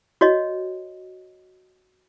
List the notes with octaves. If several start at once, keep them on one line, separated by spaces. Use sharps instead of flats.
F#4 C#5 D#5